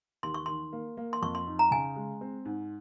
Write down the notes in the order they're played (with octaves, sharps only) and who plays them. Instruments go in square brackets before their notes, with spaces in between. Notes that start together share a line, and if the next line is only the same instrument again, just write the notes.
[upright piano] D#2 [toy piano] C6
[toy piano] C#6
[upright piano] D#3 [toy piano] C6
[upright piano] A#3
A#3
[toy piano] C6
[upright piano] F2 [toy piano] C#6
[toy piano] C6
[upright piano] D#4
[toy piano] A#5
[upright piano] C#3 [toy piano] G#5
[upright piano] G#3
C4
G#2